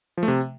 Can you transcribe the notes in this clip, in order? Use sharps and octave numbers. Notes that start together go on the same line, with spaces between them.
F3
A3
C3